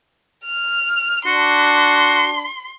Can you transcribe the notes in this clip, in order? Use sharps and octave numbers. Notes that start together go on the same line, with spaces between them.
F6
D4 F#4 C6